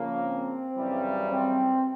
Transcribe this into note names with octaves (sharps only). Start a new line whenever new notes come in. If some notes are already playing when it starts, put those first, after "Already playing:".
Already playing: C#3 F3 A#3
C4
F#2 C#3 E3 G3
C4